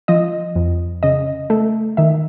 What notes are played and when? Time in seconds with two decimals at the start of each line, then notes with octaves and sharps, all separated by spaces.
0.08 F3 D#5
0.55 F2
1.03 C#3 D#5
1.50 A3
1.97 D#3 E5